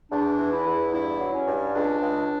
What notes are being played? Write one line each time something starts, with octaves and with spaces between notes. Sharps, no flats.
E2 D4
E3
E4
E2
G2 E4
F#3
C#4
G2
C#2 D4
C#2